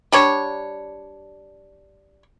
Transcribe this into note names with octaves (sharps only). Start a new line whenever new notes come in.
G3 D4 C#5